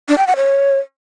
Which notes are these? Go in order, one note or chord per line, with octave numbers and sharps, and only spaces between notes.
D4
G5
F#5
C#5